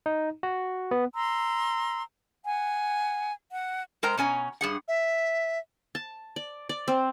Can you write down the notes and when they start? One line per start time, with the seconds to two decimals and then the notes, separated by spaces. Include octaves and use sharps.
0.06 D#4
0.43 F#4
0.91 B3
1.14 A#5 C6 E6
2.46 F#5 G#5
3.52 F#5
4.03 G#3 A#4 C5 G5 A#5
4.17 B2 C#4 G#5 A#5
4.61 G2 G#4 F#5
4.88 E5
5.95 A5
6.36 D5
6.69 D5
6.88 C4